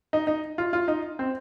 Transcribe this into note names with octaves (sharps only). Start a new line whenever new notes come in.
D#4
D#4
F4
F4
D#4
C4